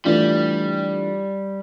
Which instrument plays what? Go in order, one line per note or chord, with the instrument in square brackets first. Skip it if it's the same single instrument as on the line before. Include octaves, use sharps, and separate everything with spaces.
[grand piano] E3 A3 D4 F4 [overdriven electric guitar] G3